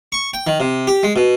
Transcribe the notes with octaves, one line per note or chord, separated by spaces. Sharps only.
C#6
G5
D#3
C3
G4
G#3
B2